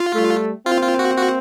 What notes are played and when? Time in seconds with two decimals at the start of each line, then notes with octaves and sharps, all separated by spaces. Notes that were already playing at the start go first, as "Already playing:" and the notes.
Already playing: F4
0.14 G3 A3
0.66 A#3 C4 F4
0.82 F4
0.99 F#4
1.16 F#4